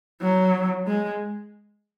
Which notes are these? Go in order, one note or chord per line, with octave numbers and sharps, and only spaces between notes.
F#3
G#3